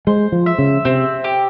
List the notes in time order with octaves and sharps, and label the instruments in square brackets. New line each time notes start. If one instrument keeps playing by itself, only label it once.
[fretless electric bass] G#3 [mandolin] C5
[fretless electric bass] F3
[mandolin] E5
[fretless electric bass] C#3
[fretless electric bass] C3 [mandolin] C4
[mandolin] G4